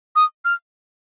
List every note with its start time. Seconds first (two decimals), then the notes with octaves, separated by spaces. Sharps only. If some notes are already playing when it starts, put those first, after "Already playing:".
0.16 D#6
0.45 F6